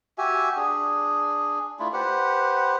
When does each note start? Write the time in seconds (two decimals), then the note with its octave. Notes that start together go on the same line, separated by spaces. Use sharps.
0.18 F#4 G4 E5 G#5
0.57 D4 G#4
1.79 A3 D4 E4 F4
1.93 G4 B4 C5 F#5